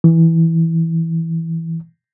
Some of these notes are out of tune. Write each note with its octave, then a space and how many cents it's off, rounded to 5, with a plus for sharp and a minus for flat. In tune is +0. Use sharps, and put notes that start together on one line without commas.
E3 -5